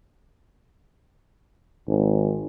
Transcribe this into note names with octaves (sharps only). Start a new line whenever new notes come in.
G#1